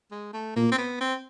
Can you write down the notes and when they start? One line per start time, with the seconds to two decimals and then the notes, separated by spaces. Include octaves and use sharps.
0.11 G#3
0.34 A3
0.56 A#2 A#3
0.72 C4
0.78 B3
1.01 C4